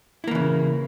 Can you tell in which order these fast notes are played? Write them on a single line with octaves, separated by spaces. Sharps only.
E4 A#3 E3 C#3